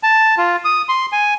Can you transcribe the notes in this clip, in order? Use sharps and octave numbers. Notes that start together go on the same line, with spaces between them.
A5
F4
D#6
C6
G#5